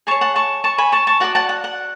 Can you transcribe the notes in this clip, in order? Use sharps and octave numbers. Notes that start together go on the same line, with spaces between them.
G#4 C#5 A5 C#6
F#5 A5
A5 C#6
A5 C#6
G#5 B5
A5 C#6
A5 C#6
F#4 B4 D5 F#5 A5
F#5 A5
F#5
F#5